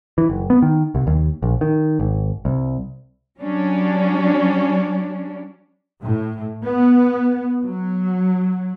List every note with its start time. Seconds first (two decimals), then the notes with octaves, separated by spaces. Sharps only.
0.18 E3
0.29 F#1
0.50 B3
0.62 D#3
0.95 C2
1.07 D#2
1.43 A#1
1.61 D#3
1.99 G#1
2.45 C2
3.39 F#3 G3 C#4 D4
6.01 A2
6.63 B3
7.64 F#3